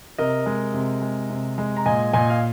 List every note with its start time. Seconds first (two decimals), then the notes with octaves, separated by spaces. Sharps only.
0.18 C3 A#4 D#5
0.46 G#3
0.74 C3
1.02 G#3
1.30 C3
1.58 G#3
1.77 A#5
1.86 A#2 D#5 G#5
2.13 A#2 D#5 G#5
2.30 F5